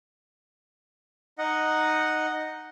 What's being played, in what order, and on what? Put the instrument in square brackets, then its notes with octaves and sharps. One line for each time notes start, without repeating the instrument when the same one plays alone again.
[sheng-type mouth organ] D#4 D#5 F#5